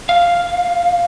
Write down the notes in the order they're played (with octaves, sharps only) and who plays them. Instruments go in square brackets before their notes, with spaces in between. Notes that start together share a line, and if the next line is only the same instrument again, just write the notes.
[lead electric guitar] F5